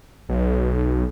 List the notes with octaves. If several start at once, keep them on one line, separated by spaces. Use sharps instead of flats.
B1